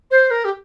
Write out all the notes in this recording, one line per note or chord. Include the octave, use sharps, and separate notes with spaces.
C5
A#4
G4